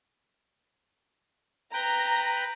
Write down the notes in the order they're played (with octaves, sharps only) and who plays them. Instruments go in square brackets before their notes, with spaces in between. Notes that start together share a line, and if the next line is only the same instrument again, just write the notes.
[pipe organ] B4 G5 [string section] A#5